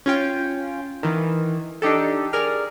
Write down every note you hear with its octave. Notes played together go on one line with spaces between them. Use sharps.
C#4 F4 G5
D#3 E3
D4 D#4 G4 A4
G#4 A#4 D5 F6